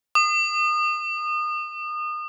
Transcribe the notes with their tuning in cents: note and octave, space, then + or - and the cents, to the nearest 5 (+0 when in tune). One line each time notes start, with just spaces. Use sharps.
D#6 -30